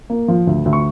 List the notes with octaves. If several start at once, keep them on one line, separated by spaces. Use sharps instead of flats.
A#3
F3
D2
D2
C#6